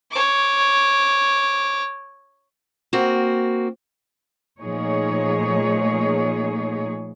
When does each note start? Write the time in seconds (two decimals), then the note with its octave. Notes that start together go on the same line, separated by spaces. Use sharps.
0.11 C#5 D6
2.93 A#3 C4 F#4
4.60 A#2 F3 A3 D#4 G#4 C#5